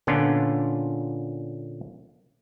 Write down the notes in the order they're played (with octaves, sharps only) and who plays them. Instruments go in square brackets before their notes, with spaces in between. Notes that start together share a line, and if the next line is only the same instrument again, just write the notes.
[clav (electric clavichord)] A#2 D3 B3 C#4 D4 F4